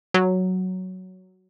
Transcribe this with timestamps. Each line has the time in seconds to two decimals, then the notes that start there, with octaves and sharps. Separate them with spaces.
0.14 F#3